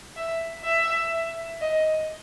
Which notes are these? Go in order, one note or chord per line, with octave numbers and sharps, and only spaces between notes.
E5
E5
D#5